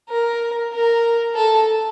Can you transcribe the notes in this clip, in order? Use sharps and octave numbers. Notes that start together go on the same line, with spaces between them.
A#4
A#4
A4